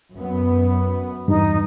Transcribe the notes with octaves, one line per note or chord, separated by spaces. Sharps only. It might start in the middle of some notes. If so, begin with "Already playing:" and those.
F#2 B3
E2 G2 D#4